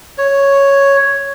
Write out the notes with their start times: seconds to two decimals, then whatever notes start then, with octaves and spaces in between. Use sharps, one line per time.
0.18 C#5